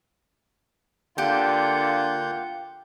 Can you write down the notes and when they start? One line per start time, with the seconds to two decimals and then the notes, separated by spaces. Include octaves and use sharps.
1.18 D3 A#3 F4 G4 F#5 G6